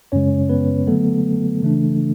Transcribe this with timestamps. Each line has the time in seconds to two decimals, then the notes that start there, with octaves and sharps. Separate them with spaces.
0.12 F#2 C#3 G#3 C#4 C#5
0.49 B3 B4
0.87 D3 F#3 A3 B3 A4
1.62 C#3 E3 A3 D4